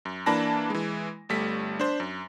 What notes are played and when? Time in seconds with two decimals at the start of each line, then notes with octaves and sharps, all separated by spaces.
0.05 F#2
0.26 E3 A#3 D4 A5 B5 A#6
0.70 E3 G#3
1.29 G1 G3 A3 B6
1.79 D4 C5
2.00 F#2